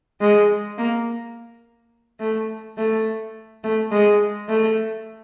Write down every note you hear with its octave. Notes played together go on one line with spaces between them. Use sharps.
G#3
A#3
A3
A3
A3
G#3
A3